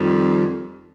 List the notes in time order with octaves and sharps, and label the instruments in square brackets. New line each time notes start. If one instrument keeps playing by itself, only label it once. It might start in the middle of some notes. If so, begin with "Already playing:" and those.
Already playing: [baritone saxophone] F2 [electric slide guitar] D#3 G3